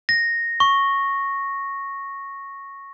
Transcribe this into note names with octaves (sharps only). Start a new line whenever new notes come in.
A#6
C#6